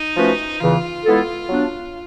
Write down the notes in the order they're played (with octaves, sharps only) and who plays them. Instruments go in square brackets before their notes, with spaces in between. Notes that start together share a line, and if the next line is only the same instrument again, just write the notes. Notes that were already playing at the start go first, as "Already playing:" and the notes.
Already playing: [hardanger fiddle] D#4
[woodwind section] F3 A3 C#4 F#4 B4
[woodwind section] E2 C#3 E3 [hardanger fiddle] F4
[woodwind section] G#3 B3 E4 A4
F#3 B3 D4